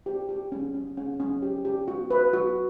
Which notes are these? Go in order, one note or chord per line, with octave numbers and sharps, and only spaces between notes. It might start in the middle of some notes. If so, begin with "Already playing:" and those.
G4
G4
C#4
C#4
C#4
C#4
G4
G4
F#4
B4
F#4